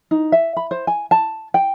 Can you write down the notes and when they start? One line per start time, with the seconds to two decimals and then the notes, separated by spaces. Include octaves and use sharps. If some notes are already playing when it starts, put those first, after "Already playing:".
0.11 D#4
0.32 E5
0.57 B5
0.71 C5
0.87 G#5
1.11 A5
1.54 G5